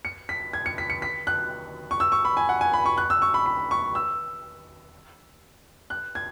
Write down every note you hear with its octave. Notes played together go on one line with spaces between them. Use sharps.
C#7
B6
G#6
C#7
B6
C#7
B6
F#6
C#6
E6
C#6
B5
G#5
F#5
G#5
B5
C#6
F#6
E6
C#6
B5
B5
C#6
E6
F#6
G#6